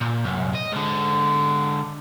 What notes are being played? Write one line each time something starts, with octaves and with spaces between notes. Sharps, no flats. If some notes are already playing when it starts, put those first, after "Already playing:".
A#2
C2 F#2
D#5
G#2 D3